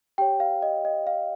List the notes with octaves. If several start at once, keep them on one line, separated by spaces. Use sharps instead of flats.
G4 C#5 G5
F5
D#5
D#5
F5